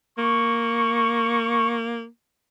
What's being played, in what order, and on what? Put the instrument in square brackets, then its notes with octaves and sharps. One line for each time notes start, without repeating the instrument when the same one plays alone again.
[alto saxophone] A#3 [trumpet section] C#6